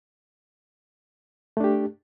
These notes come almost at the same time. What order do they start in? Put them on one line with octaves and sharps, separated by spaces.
A3 D4 G4